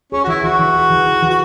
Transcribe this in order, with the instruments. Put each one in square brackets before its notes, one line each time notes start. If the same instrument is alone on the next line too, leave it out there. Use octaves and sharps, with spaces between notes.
[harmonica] C#4 [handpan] G#4
[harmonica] F#4
[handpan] E3 [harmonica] E4
[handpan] E3 [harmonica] F#4
[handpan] E3
G#4
E3
E3
E3
[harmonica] F#4